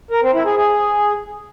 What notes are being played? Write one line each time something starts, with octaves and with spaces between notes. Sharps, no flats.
A#4
C4
E4
G#4
G#4